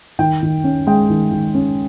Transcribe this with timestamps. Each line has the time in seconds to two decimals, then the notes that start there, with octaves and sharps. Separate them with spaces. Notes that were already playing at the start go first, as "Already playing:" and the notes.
0.19 D#3 G5
0.43 D#3
0.64 C#4
0.87 G#3 G5
1.10 D#3
1.32 D#3
1.55 C#4